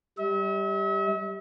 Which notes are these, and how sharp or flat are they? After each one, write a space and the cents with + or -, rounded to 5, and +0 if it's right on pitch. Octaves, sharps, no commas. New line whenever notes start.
G3 +0 E5 -45